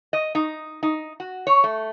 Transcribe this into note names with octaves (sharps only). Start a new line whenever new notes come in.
D#5
D#4
D#4
F#4
C#5
A3